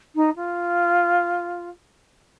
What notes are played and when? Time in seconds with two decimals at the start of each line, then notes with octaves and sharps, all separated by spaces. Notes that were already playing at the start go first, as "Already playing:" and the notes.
0.15 D#4
0.35 F4